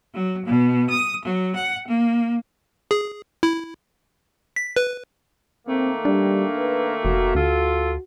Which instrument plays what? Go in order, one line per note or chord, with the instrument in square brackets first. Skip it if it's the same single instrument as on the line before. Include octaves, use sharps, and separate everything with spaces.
[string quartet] F#3
B2
D#6
F#3
F#5
A#3
[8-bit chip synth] G#4
E4
B6
B4
[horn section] D#3 A3 A#3 [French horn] C4
[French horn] G3 [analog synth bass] D4
[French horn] B4
[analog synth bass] F1 [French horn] F#4
[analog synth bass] D2 [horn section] F4 A4